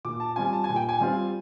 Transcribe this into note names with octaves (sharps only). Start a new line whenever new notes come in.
A#2 D6
A5
G3 C4 F4 G#5
A5
G#5
A#2
G5
G#5
G3 C4 F4